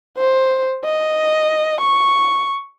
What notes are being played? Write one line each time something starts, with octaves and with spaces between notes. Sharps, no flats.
C5
D#5
C#6